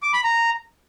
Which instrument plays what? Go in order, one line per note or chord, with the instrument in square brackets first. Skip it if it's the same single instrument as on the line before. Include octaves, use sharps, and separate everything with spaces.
[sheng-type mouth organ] D6
B5
A#5